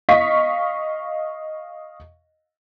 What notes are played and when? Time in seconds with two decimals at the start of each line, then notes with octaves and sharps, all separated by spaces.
0.09 D#5 F5 C#6 B6